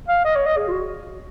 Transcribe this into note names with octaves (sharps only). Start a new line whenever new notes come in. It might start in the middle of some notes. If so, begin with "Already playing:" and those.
F5
D#5
C#5
D#5
G#4
F4
F#4